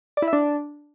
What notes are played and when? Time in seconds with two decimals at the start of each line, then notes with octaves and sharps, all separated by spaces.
0.17 D5
0.22 E4
0.28 E5
0.33 D4